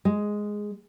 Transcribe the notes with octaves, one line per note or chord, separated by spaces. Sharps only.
G#3